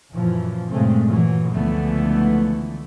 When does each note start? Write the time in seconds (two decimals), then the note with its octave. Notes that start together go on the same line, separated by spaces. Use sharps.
0.13 F#2 A#2 E3 F3
0.71 G2 A#2 C#3 G#3 A3 C4
1.07 A#2 E3 F#3
1.52 C#2 D3 E3 F3 A3 B3